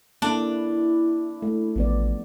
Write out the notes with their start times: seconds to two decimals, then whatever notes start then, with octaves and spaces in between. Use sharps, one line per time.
0.22 A#3 D4 E4 A4
1.42 A3
1.76 A1 F3 B3 D5